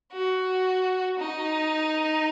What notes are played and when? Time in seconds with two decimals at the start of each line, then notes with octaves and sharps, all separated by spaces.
0.12 F#4
1.19 D#4